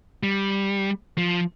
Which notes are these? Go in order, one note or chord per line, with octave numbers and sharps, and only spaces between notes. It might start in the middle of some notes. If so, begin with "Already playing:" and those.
G3
F3